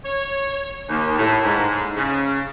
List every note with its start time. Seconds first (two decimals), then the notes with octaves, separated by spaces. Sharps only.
0.05 C#5
0.89 D#2
1.19 A2
1.45 G#2
1.96 C#3